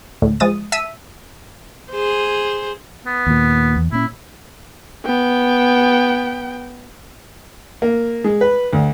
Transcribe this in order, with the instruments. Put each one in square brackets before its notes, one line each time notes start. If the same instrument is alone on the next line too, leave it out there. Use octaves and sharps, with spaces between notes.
[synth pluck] D2 A2
F3 G#3 D#6 A6 D#7
E5 A5 E6 B6 D#7
[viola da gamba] G#4 C5
[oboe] B3
[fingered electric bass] D#2 A#2
E2
[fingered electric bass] A#2 C#4 [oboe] E4
[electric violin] B3 G5
[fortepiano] A#3
G#3
B4
D2